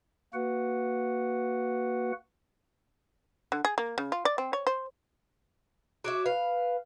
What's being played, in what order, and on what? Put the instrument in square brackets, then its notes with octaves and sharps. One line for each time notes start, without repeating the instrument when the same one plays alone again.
[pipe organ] A#3 F#4 B4 F#5
[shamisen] D3
G#4
A#3
C#3
F4
D5
C4
C#5
C5
[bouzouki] F#4 C#5 E5 [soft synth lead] D6
[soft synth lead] B4 [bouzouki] F5